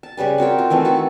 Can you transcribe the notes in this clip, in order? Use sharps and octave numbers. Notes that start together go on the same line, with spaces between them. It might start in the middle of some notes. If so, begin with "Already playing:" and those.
A5
C#3 G3 B4 G#5
C4 F#4 A#4 G5
F4
D#3 E3 A3 C4
F#4 A4 B4